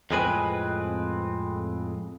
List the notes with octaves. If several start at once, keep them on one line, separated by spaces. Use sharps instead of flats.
F2 A2 G#3 C4 B4 G#5